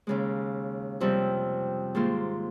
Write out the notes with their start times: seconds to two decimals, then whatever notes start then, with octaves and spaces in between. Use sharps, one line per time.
0.07 D#2 C#3 G#3
1.00 F2 C3 G3
1.95 G#2 D#3 A#3 F4